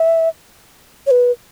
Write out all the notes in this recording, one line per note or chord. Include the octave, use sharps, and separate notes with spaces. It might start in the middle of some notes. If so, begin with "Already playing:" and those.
Already playing: E5
C#5
B4